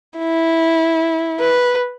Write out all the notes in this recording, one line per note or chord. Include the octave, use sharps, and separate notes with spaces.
E4
B4